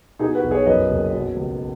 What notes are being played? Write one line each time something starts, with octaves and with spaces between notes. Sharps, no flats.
B2 D#4 G#4
F#4 B4
B1
G#4 C#5
F#2 B4 D#5
F#1
B2
C#2